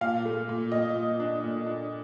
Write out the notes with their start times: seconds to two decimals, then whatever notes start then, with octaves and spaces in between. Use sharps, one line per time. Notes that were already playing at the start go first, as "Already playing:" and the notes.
0.01 A#2 F5
0.25 A3
0.49 A#2
0.72 A#2 D#5
0.96 A#2
1.20 D4
1.43 A#2
1.67 D4